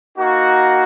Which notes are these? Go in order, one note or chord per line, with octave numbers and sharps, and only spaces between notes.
A#3 D#4 F#4